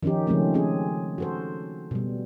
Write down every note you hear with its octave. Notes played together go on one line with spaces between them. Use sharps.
D#3 F3 C#4 D#4 G4
C#3 F3 G#3 A3 C4 C#4
C4 C#4 G#4
F#4 A4 C5
B2 G3